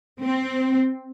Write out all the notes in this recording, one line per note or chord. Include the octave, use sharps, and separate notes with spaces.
C4